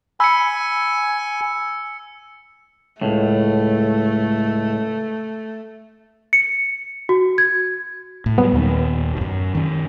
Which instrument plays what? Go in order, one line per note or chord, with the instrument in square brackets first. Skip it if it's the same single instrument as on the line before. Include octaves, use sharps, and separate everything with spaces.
[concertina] G#5 [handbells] B5 [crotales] E6 C#7
[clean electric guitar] C#2 A2 [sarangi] A3
[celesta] C#7
F#4
G#6
[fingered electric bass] A2
[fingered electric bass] F#3 G3 [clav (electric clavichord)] B3
[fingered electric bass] D#2 A#2 D#3
D1 F#2
D#3 C#4